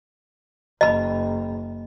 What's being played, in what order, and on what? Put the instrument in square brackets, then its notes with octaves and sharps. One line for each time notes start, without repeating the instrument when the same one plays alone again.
[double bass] F#1 [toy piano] D#5 B5